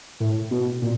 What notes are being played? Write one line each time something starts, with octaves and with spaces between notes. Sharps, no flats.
A2
B2
A#2